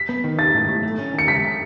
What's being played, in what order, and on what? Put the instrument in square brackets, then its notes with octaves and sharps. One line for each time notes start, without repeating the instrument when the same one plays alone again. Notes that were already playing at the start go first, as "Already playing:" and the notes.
Already playing: [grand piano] B6
[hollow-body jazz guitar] B3
D#3
[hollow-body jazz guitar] D#4 [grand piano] A6
[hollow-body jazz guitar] A2
A2
A3
C#4
[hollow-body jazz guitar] D#3 [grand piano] C#7
[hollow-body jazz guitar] C#2 [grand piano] B6